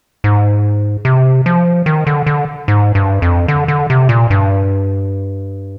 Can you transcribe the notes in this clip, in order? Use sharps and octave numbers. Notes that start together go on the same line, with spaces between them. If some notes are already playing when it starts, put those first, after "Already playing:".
G#2
C3
F3
D#3
D3
D3
G#2
G2
F2
D3
D3
C3
A#2
G2